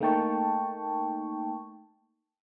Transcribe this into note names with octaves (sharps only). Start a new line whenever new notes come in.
A3 A#3 D#4 G5 A5 C#6